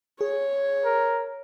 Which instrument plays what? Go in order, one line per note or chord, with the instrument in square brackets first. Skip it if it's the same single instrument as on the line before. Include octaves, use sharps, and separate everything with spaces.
[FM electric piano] G#4 [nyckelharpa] C#5
[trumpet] A#4